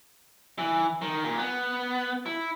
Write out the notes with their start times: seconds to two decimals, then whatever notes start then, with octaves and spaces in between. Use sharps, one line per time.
0.58 E3
1.02 D#3
1.24 A#2
1.38 B3
2.26 E4